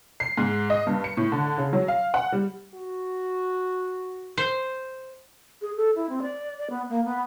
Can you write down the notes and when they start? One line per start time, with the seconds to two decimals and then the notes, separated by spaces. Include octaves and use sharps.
0.20 C7
0.37 G#2
0.70 D#5
0.87 G2
1.04 C#7
1.17 A2
1.32 D3
1.58 C#3
1.73 F#3
1.88 F5
2.14 F#5
2.32 G3
2.74 F#4
4.38 C5
5.61 G#4
5.76 A4
5.95 E4
6.09 C4
6.22 D5
6.58 D5
6.70 B3
6.89 A#3
7.05 B3